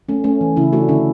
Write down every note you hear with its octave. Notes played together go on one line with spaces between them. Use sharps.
A3 C#4
A3 C#4
E3
C#3 C#4 E4
A3 D4 F#4
D3 C#4 E4